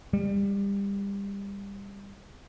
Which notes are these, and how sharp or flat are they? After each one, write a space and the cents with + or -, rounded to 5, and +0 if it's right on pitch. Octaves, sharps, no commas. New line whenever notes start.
G3 +25